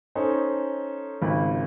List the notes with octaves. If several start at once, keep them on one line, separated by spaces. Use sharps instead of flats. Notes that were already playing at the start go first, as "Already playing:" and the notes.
C#4 D#4 A4 C5
G#1 C#2